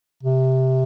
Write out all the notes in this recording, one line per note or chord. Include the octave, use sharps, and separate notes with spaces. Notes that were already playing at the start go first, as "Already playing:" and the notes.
C3